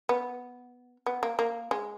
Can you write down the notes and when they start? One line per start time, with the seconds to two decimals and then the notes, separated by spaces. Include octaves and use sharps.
0.09 B3
1.06 B3
1.23 A#3
1.39 A#3
1.71 G#3